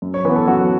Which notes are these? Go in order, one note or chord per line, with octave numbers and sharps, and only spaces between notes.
F#2
C#5
E3 B3 B4
A4
F#2 F#4